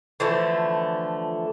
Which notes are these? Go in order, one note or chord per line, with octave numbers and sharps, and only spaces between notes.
D3 E3 F3 A3